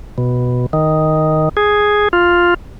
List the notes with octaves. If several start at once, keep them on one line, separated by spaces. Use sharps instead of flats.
B2
D#3
G#4
F4